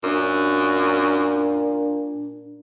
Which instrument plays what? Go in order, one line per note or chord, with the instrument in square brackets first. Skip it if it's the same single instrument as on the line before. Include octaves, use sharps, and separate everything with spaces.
[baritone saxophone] F#2 [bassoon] A#2 [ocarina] D4